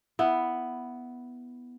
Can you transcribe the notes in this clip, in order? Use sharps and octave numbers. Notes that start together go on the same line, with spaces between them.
B3 E4